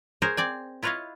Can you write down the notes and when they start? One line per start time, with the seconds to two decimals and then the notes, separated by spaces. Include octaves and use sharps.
0.22 G#4 A#4 C5 C#5 G#5
0.37 C4 D5 G#5
0.83 E4 F4 B4 C#5 D#5 F5